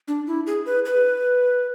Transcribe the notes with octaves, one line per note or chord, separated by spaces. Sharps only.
D4
E4
G#4
B4
B4